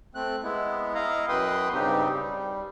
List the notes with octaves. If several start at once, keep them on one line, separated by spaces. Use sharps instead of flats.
A3 C4 F#6
G#3 B3 E4
E4 D#5 F5 A#5
F#2 B2 B4 G5 C6 D#6
G2 C#3 C4 D#4 G4
G3